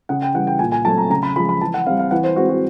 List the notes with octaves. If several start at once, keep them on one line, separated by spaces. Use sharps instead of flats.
C#3 F#5
G5
E3 G3 F#5
G5
A#2 G#5
G#5
F#3 A3 C4 A5
A#5
C#3 A#5
B5
F3 G#3 B5
B5
E3 A5
F#5
G3 C4 F5
F5
E3 F#5
C5
G#3 C4 F#4
F#4